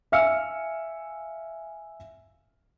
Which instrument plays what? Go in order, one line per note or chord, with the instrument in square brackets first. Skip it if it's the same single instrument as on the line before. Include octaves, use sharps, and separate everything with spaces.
[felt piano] E5 F5 G#5 E6 F6 C#7